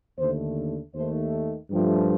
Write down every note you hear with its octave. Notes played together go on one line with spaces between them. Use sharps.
D#2 D3 A3 C5
D#2 D#3 A3 C5
G2 F3 A3 G4